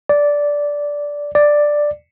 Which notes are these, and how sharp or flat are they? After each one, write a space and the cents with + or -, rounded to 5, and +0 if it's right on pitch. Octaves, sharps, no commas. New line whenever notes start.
D5 -10
D5 +5